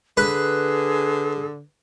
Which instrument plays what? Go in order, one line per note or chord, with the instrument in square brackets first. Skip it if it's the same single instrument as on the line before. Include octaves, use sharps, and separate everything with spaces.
[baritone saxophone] D3 [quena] G#4 [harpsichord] B4